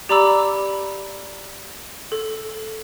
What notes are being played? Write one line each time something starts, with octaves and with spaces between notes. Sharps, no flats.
G4 D5 A#5 B5 D6 E6
A4